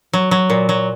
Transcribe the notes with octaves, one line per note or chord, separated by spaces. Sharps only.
F#3
F#3
A#2
F#3